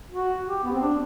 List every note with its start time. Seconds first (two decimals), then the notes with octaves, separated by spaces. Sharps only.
0.11 F#4
0.47 G4
0.64 B3
0.72 C4
0.81 D4